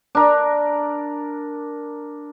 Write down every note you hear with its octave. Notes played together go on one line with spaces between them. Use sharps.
D4 A#4